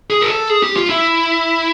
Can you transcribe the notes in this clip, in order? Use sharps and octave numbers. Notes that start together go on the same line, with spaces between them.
G#4
A#4
A4
G#4
G4
F4
E4